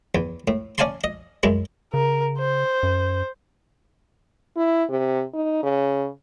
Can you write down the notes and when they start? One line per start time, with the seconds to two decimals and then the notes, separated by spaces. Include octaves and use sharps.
0.15 E2
0.48 A2
0.78 C#4 D5 F5 G#5 A5 C6
1.04 D#5
1.43 F#2 G#3 E4
1.94 C#3 A#4
2.38 C5
2.83 F#2
4.57 E4
4.89 C3
5.33 D#4
5.63 C#3